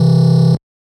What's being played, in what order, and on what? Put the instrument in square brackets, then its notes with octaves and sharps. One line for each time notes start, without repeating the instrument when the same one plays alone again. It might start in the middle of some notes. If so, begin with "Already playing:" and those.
Already playing: [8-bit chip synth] C3 E3